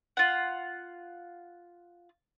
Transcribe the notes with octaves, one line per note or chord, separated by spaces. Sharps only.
F4 F#5